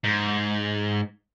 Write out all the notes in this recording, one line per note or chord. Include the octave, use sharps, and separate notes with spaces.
G#2